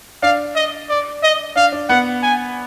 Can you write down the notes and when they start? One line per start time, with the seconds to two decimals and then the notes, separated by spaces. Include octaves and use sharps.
0.23 D4 F5
0.55 D#5
0.89 D5
1.23 D#5
1.56 D4 F5
1.72 D4
1.89 B3 F#5
2.23 G#5